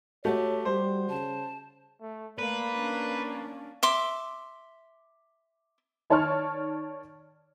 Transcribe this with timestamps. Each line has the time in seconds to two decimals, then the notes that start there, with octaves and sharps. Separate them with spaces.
0.25 A3 F#4 G4 C#5
0.65 G3 C5
1.09 C#3 A5
2.01 A3
2.38 A3 A#3 B4 D5
2.76 C#4 D4
3.83 E5 C6 D6
6.10 D#3 C#5 D5 A5 C#6 F6